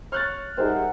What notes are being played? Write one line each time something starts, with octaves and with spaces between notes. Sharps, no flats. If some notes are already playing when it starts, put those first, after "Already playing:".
C#5 F6 F#6 A6
G3 D#4 G#4 A#4 C5 E5 F#5